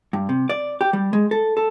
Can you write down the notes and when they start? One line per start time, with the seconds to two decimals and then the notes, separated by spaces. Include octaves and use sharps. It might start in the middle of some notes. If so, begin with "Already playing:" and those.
0.13 G2
0.29 C3
0.49 D5
0.81 G4
0.93 G3
1.13 G#3
1.31 A4
1.57 A4